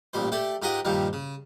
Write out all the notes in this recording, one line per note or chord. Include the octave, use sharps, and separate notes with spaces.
A1 A#2 G3 C5
A3 G4 A4 D5
G#2 F4 G4 A#4 F#5 D#6
G2 A#2 D#3 F3 G3
C#3